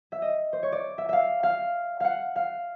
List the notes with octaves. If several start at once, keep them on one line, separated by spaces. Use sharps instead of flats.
E5
D#5
C5
C#5
D5
E5
E5 F5
F5
F5 F#5
F5